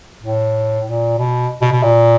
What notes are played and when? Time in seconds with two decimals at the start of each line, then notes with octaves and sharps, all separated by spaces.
0.23 A2
0.86 A#2
1.19 B2
1.62 B2
1.72 B2
1.83 A#2